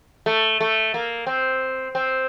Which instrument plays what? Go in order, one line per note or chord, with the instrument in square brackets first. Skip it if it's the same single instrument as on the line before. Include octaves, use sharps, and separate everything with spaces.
[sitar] A3
A3
A#3
C4
C4